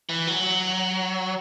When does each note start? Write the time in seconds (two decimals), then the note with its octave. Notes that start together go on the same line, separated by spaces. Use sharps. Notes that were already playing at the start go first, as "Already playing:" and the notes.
0.09 E3
0.27 F#3